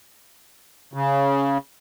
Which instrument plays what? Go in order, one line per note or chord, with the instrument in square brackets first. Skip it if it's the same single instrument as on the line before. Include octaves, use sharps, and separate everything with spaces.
[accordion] C#3